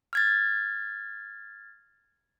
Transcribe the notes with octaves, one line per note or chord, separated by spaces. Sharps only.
F6 G#6 A6